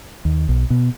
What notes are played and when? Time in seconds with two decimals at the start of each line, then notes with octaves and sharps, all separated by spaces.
0.25 D#2
0.49 B1
0.70 B2